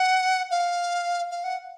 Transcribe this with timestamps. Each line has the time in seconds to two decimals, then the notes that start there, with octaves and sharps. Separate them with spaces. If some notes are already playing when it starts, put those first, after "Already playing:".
Already playing: F#5
0.51 F5
1.31 F5
1.44 F#5